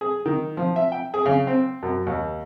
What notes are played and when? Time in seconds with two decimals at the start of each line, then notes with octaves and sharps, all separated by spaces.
0.01 G#4
0.26 D#3
0.57 F3
0.76 E5
0.92 G5
1.14 G#4
1.26 C#3
1.47 C4
1.83 F#2
2.07 D#2